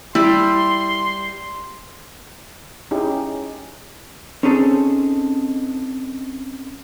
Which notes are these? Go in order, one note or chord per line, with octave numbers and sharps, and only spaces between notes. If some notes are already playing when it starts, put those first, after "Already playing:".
G3 E4 C6
C#4 D#4 E4 G4 G#4
C4 C#4 D#4 G#4 A4